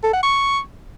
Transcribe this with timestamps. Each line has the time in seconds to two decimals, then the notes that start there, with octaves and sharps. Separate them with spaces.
0.04 A4
0.13 F#5
0.23 C#6